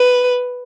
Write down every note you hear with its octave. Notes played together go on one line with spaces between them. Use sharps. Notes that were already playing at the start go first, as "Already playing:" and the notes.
Already playing: B4